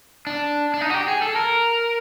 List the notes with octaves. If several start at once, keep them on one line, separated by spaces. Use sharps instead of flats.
D4
D4
D#4
F#4
G4
G#4
A4
A#4